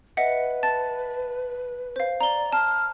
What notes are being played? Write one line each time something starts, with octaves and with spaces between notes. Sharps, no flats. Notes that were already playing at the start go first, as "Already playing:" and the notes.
B4 D#5 E5 F#5
A5 A6
C5 F5
D5 A#5 G7
A5 F6